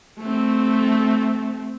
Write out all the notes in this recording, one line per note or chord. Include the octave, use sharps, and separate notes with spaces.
A3 C4